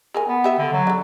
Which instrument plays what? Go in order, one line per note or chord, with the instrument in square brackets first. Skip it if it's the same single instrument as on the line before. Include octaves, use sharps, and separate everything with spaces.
[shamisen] G#4 A#4 G#5
[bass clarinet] B3
[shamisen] G4 E5
[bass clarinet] D3
F#3
[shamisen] D4 A4